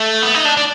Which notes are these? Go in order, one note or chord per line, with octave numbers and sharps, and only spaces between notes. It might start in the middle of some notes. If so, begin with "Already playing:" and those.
Already playing: A3
B3
D#4
D4
D4